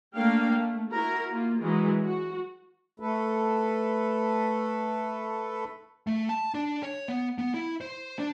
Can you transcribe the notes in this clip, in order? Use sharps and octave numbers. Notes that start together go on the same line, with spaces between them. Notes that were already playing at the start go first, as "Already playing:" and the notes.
A3 A#3 D4 F5 G5
A3
E4 F#4 A#4
A#3 F4
E3 F#3 G#3 A#4
F#4
A3 A4 B4
A3
A5
D4
C#5
B3
B3
E4
C5
D4